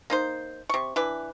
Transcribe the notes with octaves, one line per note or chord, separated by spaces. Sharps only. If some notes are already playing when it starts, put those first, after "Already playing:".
A#3 D#4 C5
C3 C#6
E3 D4 B4